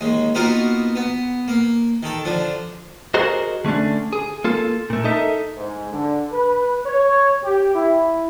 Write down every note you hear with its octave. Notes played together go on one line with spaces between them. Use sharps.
D#2 G#3
A#3 B3 D#4 F4 F#4 A#4
B3
A#3
D#3 A4
D3 F3 D4
F#4 G#4 A#4 C5 D#5
D3 A3 C#4 D4
G#4
A#3 F4 A4
A#2 A3
D#4 A4 A#4 D#5 E5
G#2
D3
B4
C#5
G4
E4